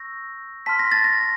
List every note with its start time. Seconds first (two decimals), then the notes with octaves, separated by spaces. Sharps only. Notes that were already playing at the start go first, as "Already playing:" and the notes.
Already playing: C#6 E6 G6 A#6
0.66 A5 C6 F6 B6
0.79 A#6
0.92 A6
1.04 A#6